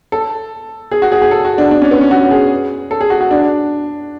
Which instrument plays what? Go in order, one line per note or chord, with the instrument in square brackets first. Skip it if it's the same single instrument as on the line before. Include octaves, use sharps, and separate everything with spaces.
[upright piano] A4
G#4
F#4
G#4
G#4
A4
F#4
D4
D4
C#4
B3
C#4
F#4
G#4
A4
G#4
F#4
F#4
D4